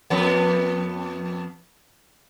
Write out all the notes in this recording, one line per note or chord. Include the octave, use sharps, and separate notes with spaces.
F2 B3